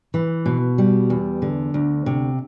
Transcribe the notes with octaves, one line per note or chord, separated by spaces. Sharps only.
E3
B2
G3
E2
D3
D2
C3